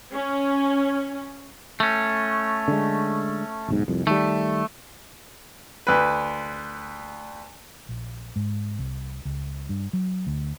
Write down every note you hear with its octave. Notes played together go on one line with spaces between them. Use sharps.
C#4
A3 C#4
D3 G#3
D1 B1 G#2
C2 F2
D#3 G3 A3
D2 B4
A#1
G#2
C2
C#2
G2
F#3
D2